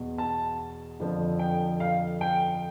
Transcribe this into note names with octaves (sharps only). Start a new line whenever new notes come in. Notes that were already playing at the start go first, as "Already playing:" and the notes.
Already playing: E2 B2
A5
F2 D3 F3
G5
F5
G5